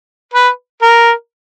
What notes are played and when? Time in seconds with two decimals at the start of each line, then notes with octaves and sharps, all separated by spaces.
0.34 B4
0.82 A#4